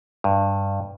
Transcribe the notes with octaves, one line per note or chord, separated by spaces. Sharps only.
G2